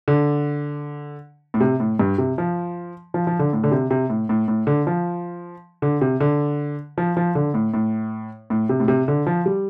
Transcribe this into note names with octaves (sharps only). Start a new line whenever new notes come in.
D3
A2
C3
A2
G2
C3
F3
F3
F3
D3
A2
D3
C3
C3
A2
A2
A2
D3
F3
D3
C3
D3
F3
F3
D3
A2
A2
A2
C3
A2
C3
D3
F3
G3